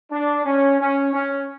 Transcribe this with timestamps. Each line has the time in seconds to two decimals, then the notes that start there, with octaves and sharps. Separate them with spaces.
0.11 D4
0.45 C#4
0.79 C#4
1.13 C#4